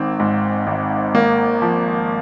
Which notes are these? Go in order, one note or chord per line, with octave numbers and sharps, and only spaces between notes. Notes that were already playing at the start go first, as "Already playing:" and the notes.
Already playing: G#1 D#3 C4
G#2
G#1
G#1 A#3
F3